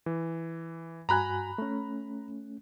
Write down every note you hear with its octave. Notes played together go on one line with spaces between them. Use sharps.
E3
G2 F#4 G#5 A#5 B5 F#6
A3 C#4